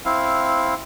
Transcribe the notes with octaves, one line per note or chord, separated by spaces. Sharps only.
C4 E4 F5